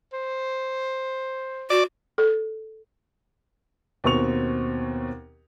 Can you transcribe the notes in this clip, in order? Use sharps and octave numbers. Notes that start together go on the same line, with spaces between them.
C5
F#4 D5
A4
D#2 B2 C4 C#6 F7